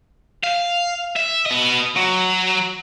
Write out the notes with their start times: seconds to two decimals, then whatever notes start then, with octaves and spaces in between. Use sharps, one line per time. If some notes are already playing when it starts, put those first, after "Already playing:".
0.44 F5
1.16 E5
1.46 B3 D#5
1.96 F#3